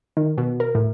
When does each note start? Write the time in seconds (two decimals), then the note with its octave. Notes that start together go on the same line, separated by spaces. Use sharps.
0.17 D#3
0.38 B2
0.60 A#4
0.75 A2